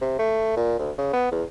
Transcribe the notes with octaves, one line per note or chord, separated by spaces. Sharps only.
C3
A3
A#2
D2
C#3
B3
E2